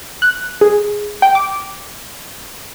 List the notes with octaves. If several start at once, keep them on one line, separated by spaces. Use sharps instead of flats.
F#6
G#4
G5
D6